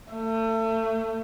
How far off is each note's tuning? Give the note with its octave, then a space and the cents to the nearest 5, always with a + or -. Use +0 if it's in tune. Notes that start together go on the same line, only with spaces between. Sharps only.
A3 +30